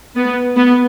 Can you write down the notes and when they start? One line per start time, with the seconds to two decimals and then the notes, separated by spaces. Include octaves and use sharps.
0.16 B3
0.57 B3